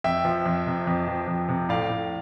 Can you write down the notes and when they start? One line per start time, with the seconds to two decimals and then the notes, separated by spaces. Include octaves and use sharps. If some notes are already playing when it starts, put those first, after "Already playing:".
0.04 F2 E5 G5
0.25 F3
0.46 F2
0.66 C3
0.87 F2
1.08 F3
1.27 F2
1.48 C3
1.69 A2 D5 F5
1.90 A2